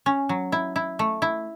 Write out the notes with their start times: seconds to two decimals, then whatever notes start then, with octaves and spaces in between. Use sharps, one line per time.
0.06 C#4
0.29 F#3
0.52 E4
0.76 E4
0.99 A3
1.22 E4